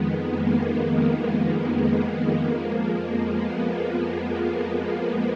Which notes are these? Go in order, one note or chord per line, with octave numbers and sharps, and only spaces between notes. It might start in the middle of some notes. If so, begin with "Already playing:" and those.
Already playing: F2 D#3 G#3 B3
A#3
B3
A#3
B3
B3
F2 F3 G#3 A#3
B3
B3
A#3